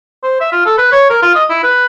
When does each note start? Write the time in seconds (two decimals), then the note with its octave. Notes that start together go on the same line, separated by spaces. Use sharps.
0.23 C5
0.40 E5
0.52 F4
0.66 A4
0.78 B4
0.92 C#5
1.10 A#4
1.22 F4
1.35 D#5
1.50 E4
1.63 B4